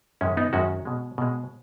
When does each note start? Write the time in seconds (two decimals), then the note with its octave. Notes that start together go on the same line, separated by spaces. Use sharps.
0.21 F#2 D#3 G#3 C#4
0.37 B3 D#4
0.53 F#2 D#3 G#3 C#4 F#4
0.85 B2 G#3
1.18 B2 G#3